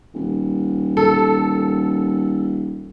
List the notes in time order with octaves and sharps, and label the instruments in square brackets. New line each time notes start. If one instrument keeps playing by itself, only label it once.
[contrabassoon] D#1
[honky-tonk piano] A4